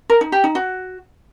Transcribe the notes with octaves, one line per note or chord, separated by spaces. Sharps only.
A#4
D#4
G4
D#4
F#4